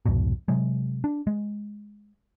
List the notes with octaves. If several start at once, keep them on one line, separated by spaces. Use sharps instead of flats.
C2 F2 G#2 B2
C3 F#3 G#3
D4
G#3